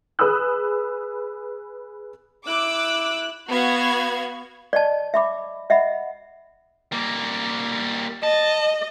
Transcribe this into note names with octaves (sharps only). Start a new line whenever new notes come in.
G#4 B4 B5 D#6 E6 F#6
E4 D6 E6 F#6
B3 F#4 F5 G#6
D5 D#5 A5
E5 B5 D6
D#5 E5 F#5 B5
G3 A#3
D#5 A5